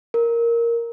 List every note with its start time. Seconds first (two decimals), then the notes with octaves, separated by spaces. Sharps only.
0.14 A#4